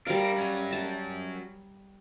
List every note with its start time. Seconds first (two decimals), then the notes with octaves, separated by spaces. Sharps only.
0.07 G3 D4 A#4 F5
0.38 F#3 C#4
0.71 A5 A#5